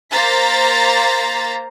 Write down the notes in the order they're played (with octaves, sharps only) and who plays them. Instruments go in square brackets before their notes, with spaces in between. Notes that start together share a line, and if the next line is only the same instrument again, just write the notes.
[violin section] A#3 C5 A#5 A6 B6